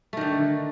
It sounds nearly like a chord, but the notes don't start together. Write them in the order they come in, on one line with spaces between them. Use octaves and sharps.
A3 D#3 D3